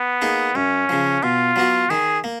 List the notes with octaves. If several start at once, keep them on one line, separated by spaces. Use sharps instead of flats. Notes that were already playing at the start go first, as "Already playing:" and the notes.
Already playing: B3
A#3 D#4 G#4
F#2 C#4
C#3 F3
B2 F4
F#3 B3 F#4
D#3 G#4
A#3